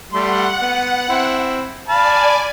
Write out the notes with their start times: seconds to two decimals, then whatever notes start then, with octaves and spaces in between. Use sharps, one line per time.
0.13 G3 A3 F#5 C6
0.61 B3
1.09 C4 E4
1.88 D5 F5 G#5 A5 B5